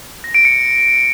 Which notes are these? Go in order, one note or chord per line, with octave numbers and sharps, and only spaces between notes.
A#6
D7
C#7